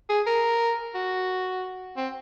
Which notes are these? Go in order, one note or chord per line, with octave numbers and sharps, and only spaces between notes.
G#4
A#4
F#4
C4